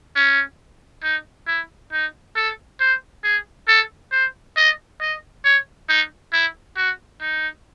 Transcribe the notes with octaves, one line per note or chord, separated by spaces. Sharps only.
C#4
D#4
E4
D#4
A4
C5
G#4
A4
C5
D#5
D#5
C#5
D#4
E4
F#4
D#4